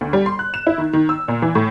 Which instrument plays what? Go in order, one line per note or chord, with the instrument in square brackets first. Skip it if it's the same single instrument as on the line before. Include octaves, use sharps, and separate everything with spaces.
[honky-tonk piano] D2
G3
C6
F#6
E7
E4
D#3
D#3
E6
A#2
E3
A2